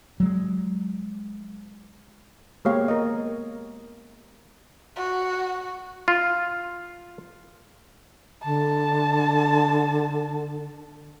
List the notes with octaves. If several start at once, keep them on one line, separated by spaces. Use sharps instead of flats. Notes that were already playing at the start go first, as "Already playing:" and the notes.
F#3 G#3
G#3 A#3 B3 G4 C#5 F5
A#4 D#5
F#4
F4
D3 A5